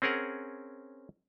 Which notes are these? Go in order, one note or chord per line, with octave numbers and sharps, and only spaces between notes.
C4 C#4 G#4 A#4 F#5